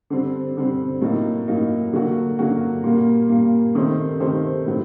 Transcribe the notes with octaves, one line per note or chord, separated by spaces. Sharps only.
D3 G3 C4
D3 G3 C4
A2 F#3 A#3 D#4
A2 F#3 A#3 D#4
D3 F#3 A#3 F#4
D3 F#3 A#3 F#4
A#2 G3 A#3
A#2 G3 A#3
D#3 A3 C4 G4 C5
D#3 A3 C4 G4 C5
A2 F#3 C4